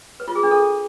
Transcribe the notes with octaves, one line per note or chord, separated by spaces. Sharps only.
B4
F4
G#4
D4
A4